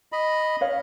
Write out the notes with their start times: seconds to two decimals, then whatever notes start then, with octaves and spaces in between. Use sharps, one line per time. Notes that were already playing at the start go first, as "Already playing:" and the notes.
0.12 D#5 B5
0.61 C#5 F5